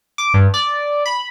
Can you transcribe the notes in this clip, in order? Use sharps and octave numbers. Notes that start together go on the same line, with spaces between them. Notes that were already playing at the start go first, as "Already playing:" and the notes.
D6
G2
D5
B5